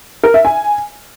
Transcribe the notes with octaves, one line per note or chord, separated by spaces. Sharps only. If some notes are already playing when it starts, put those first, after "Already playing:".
A#4
E5
G#5